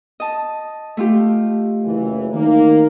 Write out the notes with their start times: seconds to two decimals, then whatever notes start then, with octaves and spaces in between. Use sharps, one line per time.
0.20 D#5 A5
0.97 A3 F4 G4
1.84 F#1 E3
2.33 D#3 A#3